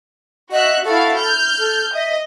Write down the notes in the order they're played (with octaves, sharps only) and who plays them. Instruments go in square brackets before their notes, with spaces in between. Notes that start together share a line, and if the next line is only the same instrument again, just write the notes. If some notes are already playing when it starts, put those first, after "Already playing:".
[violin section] F#4 E5 F#6 [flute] D#5
[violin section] E4 F#4 F5 [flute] A4
[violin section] F6 G6
[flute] A4
[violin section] D#5 [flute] E5